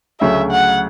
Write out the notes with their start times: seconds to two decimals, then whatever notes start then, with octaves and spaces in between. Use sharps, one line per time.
0.21 D2 C#3 F#3 A3 E5
0.51 F#5